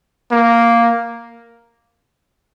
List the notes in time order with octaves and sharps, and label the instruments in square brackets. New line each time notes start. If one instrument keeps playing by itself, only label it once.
[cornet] A#3